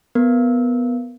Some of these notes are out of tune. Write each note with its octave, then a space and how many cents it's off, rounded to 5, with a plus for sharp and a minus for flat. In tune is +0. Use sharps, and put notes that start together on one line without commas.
B3 +0 A#4 +0